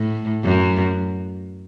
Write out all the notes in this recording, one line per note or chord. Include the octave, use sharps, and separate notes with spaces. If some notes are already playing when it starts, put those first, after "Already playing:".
Already playing: A2
F#2